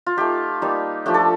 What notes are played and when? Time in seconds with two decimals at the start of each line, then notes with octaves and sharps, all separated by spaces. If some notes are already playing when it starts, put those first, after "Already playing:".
0.06 F4
0.17 A3 D#4 G4
0.62 G3 A#3 D#4
1.06 F3 A3 D4 G4
1.14 A4